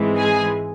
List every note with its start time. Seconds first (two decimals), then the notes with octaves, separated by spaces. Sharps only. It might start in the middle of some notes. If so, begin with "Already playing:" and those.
Already playing: G#2 E3 G#3 C4
0.18 G#4 G#5